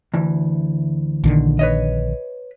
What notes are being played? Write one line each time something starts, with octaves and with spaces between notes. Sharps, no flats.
D2 E3
A#1 D3 D#3
B4 C#5 D#5